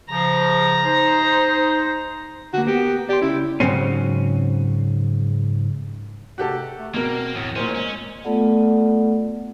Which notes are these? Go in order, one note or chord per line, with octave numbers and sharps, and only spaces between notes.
C#3 F3 A#5
D#4 C5
D3 A#3 F#4
B3 G4 A#4
G4 D5 C6
C#2 C#4 E4
G#2 C#3 F#3 C4 C#4
C3 F#4 G4 A4
A3
B2 A#3 C4 A#4
E2 A2
A#2 C#4 A#4 C5
G#3 C#4
A3 B3 F4 A4 D5 F#5